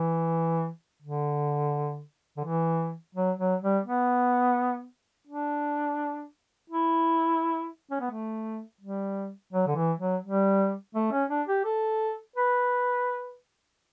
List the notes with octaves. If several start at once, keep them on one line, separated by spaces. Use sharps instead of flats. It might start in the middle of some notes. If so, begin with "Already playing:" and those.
Already playing: E3
D3
D3
E3
F#3
F#3
G3
B3
D4
E4
C#4
B3
A3
G3
F#3
D3
E3
F#3
G3
A3
C#4
D4
G4
A4
B4